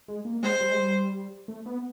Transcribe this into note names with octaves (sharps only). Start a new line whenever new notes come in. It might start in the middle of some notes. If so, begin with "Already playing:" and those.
G#3
A#3
G#3 C5
G3
G#3
G3
A3
B3